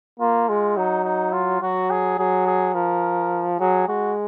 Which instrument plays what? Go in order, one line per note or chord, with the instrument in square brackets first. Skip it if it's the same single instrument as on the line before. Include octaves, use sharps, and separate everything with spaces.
[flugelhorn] A#3 [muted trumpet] F4
[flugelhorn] G#3 [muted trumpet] F4
[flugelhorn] F#3 [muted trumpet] D#4
[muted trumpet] D#4
F4
[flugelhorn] F#3 [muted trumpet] F#4
[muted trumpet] G#4
[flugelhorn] F#3 [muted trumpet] G#4
[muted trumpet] G#4
[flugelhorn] F3 [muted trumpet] A#4
[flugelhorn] F#3 [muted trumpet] G#4
[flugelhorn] G#3 [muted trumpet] F#4